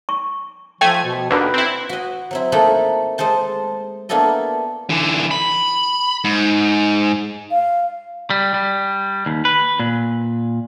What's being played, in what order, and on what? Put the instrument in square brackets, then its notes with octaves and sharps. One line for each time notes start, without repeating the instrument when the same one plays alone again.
[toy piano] C#6
[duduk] F3 [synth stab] A3 G#5 G#6 [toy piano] G5
[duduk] B2
[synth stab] D#2 D3 [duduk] B4
[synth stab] C4 E4
[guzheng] F#4 D#5
F#3 C4 E4
A3 A#3 D#4 E4 A4 F#5
G#3 A4 C5 A5
A#3 B3 D4 E4 A4 D#5
[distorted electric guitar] D3 E3
B5
G#2
[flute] F5
[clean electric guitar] G3
G3
D#2
B4
A#2